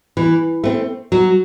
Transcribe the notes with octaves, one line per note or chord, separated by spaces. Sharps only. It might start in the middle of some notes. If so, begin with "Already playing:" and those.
E3
A3 C4
F#3